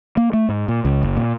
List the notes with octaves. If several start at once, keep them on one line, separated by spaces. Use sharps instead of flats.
A#3
A3
G#2
A#2
C#2
F#1
A#2